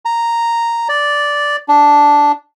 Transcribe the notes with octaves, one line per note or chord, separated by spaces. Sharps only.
A#5
D5
D4